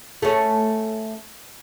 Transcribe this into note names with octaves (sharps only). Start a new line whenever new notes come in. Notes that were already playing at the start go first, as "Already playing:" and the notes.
A3 C#4